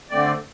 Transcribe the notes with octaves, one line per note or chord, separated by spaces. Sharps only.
D3 A3 C4 D5